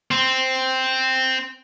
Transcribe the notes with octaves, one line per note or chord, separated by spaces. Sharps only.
C4